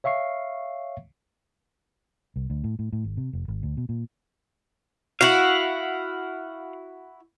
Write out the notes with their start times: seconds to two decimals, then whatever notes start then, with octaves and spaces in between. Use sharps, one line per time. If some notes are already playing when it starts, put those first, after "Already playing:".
0.04 C#5 E5 F5 C#6 C7
2.36 C2
2.50 D2
2.64 A2
2.79 A2
2.93 A2
3.04 G#1
3.17 C3
3.33 F1
3.48 G#1
3.63 D2
3.77 B2
3.89 A#2
5.21 E4 F#4 F5 F#5